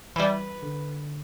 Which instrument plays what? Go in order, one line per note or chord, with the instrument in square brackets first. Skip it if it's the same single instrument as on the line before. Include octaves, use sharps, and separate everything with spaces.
[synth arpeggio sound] E3 G3 [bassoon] B4
[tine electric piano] D3